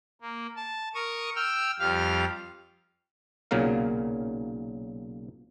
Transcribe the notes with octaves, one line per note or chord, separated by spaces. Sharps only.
A#3
A5
A#4 C#6 D#6
G5 E6 F6
F2 G3 G4 F5 F6
B1 A#2 C#3 F#3 A#3 F5